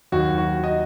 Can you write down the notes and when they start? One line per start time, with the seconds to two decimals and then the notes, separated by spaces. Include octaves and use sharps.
0.12 D#2 D#3 F#3 F#4
0.38 F#4
0.64 D#5